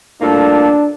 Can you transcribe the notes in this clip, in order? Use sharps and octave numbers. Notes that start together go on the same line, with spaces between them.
A2 G3 A#3 D4 F4 A4